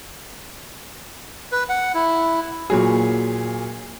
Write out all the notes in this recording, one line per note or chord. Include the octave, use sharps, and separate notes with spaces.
B4
F#5
E4
A#2 F#3 G#4